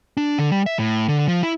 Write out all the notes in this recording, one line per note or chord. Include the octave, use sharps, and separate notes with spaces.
D4
D3
G3
E5
A2
D3
F3
E4